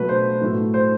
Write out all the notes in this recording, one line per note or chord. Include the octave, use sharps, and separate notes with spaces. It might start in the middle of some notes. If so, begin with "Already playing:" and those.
Already playing: B2 F#3 A3 B4
C5
A2 F#3 A3
C5